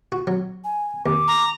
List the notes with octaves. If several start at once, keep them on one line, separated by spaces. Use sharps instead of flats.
F#4
F#3
G#5
D#2 D6
A#5